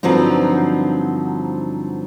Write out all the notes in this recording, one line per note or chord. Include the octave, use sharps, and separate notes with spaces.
G2 D3 F3 F#3 C4 D#4